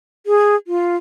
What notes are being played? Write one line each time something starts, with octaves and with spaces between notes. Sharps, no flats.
G#4
F4